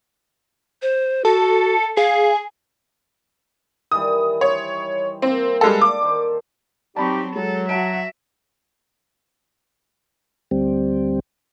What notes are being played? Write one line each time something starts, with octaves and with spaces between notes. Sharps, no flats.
C5
F#4 A4
G#4 F5
D#3 E3 G3 D#6
C5 C#5
A#3 C4
G3 G#3 A4
A4 D5 D6
D#3 C5
F#3 G3 C4 D#4 G4 A5 B5 C#6
F#3 G#3 A4
F#4 E5 F#5 A5 D7
D2 G3 C4